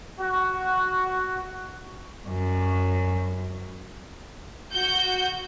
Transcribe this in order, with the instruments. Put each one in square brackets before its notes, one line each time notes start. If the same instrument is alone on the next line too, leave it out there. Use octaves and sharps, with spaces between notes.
[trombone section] F#4
[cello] F#2
[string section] F#4 G6